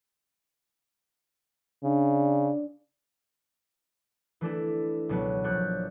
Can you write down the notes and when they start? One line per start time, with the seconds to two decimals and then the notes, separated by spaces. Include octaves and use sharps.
1.84 C#3 D4
4.41 E3 A3 D4 E4
5.09 C#2 B2 F#3 B3
5.44 A#1 D4 C#5 C#6 F#6 G6